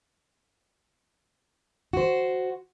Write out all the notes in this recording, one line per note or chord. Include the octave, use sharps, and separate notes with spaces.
F#4 C5